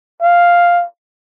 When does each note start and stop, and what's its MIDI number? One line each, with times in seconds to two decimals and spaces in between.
0.22 0.85 77